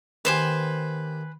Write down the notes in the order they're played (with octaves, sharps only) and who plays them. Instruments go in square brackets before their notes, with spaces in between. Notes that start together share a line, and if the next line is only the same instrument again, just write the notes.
[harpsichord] D#3 A#3 G4 [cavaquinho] B4 C5 G#5